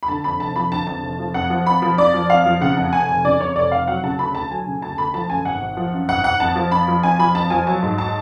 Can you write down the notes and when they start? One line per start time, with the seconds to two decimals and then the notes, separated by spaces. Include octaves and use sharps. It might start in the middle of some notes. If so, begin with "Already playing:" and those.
0.03 B5
0.08 D3 A5
0.24 F2 B5
0.40 F1 A5
0.56 F3 B5
0.71 D3 A5
0.87 F2 A5
1.03 F1
1.19 F3
1.34 F2 F#5
1.50 F3
1.66 F2 B5
1.82 F3
1.98 F2 D5
2.14 F3
2.30 F2 F5
2.46 F3
2.61 C#3 F#5
2.77 F2
2.93 F1 G#5
3.09 F1
3.24 C#3 D5
3.40 F2 C#5
3.56 F1 D5
3.72 F1 F5
3.87 F#3 F#5
4.03 C#3 A5
4.19 D2 B5
4.35 D2 A5
4.50 F#3 G#5
4.66 C#3
4.82 D2 A5
4.98 D2 B5
5.14 F3 A5
5.30 F#2 G#5
5.45 G#1 F#5
5.61 G#1
5.77 F3
5.93 F#2
6.08 G#1 F#5
6.24 G#1 F#5
6.40 F2 A5
6.56 F3
6.72 F2 B5
6.88 F3
7.03 F2 G#5
7.19 F3 B5
7.35 F2 A5
7.50 F3 G#5
7.67 F#3 A5
7.83 G#2
7.98 A5